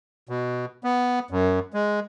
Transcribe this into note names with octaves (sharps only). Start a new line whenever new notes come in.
B2
B3
F#2
G#3